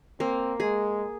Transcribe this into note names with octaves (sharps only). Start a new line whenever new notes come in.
A#3 C4
G#3 G#4